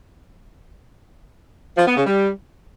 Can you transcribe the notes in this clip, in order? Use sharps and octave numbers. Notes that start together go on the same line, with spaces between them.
F3
B3
C#3
G3